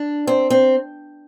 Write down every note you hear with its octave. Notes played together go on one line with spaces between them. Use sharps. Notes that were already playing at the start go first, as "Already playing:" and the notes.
Already playing: D4
C4
C4